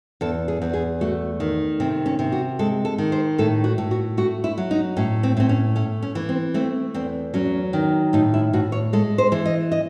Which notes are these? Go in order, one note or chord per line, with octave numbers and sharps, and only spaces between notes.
E2 A4
G#4
E2
G#4
A3 F#4
D#3
C3 C4
C#4
C3
F#4
G#3 A4
A4
D#3
C5
A2 A4
F#4
A2
F#4
A3 F#4
E4
F#3
D#4
A2 C#4
C4
A2 C4
C#4
A3 C#4
C#4
E3
C4
A3 C4
E2 C4
F#3 C#4
D#3
A2 D#4
E4
A2 F#4
C#5
G#3 A4
C5
E3
D#5
D#5